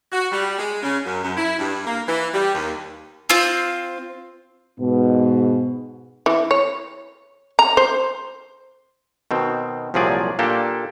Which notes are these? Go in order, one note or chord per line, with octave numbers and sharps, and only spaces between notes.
F#4
G3
G#3
C#3
F#2
F#2
E4
G2
A#3
E3
G3
D#2
C4 F4
G#2 B2 B3
E3
C#5
A#5
C5
B2 D#3 C4
C2 A#2 F3 F#3 G#4 D5
A#2 A#3 D4 G4 A4